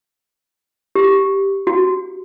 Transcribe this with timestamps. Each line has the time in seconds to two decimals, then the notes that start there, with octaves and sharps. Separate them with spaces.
0.95 G4
1.67 F#4